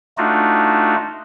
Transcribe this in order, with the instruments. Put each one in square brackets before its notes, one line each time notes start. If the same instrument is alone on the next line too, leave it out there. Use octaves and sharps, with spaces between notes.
[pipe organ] A3 D4 D#4 F4 F#4